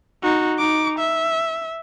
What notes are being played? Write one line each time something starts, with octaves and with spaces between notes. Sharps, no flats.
D#4 F#4
D#4 D6
E5